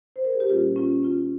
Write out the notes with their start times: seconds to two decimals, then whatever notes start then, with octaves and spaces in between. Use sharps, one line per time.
0.16 C5
0.25 A#4
0.33 G#4
0.40 G4
0.50 A#2 G3 A#3 C#4 F4
0.76 C#4 F4
1.03 C#4 F4